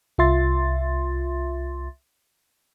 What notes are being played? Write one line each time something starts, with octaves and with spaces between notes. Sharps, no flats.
C2 F4 E5 C6 A6